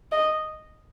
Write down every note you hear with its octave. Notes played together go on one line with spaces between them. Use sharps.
D#5